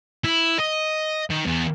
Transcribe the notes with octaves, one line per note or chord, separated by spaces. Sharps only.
E4
D#5
D#3
E2